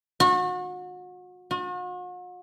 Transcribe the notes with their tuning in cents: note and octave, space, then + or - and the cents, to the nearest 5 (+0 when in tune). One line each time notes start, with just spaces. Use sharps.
F#4 -35
F#4 -45